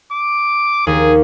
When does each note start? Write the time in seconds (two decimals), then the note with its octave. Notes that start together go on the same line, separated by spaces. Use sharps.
0.13 D6
0.87 D#2 G#4